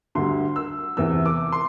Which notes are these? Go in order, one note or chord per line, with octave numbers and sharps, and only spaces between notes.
D2 D3 G3 C6
E6
E2 C3 E3 E6
D6
C6